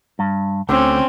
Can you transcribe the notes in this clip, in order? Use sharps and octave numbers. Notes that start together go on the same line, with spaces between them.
G2
D2 D3 C4 C#4